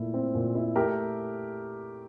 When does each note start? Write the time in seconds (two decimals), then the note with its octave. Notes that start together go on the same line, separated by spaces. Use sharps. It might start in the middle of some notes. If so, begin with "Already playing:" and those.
Already playing: A#2 A3 E4
0.14 C4
0.35 A#2
0.55 E4
0.76 A3 G4 A#4